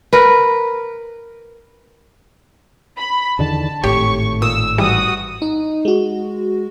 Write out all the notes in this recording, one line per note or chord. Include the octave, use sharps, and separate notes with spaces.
A#4 B4
B5
E2 D3 D#3 A5
G#1 A2 G4 C#5 G5 C#6
A#2 D#6 E6
G#2 E3 G3 F#4 D#6
D#4
G#3 F#4